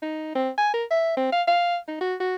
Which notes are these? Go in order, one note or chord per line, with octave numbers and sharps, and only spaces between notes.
D#4
C4
G#5
A#4
E5
C4
F5
F5
D#4
F#4
F#4